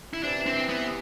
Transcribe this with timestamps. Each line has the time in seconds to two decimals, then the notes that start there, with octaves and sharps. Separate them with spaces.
0.14 E4
0.23 C3 E3 D4
0.46 C4
0.69 B3